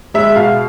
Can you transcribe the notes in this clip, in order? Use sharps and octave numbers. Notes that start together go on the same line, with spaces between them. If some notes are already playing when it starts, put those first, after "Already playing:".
G#3 E5
B2 F5